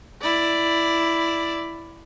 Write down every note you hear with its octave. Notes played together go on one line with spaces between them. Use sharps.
E4 D5